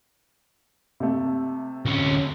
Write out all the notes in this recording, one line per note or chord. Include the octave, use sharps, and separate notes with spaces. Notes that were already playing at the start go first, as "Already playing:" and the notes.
C3 A3
D2 C#4